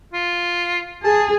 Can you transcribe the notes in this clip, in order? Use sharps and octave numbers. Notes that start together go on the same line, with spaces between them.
F4
G#4 A5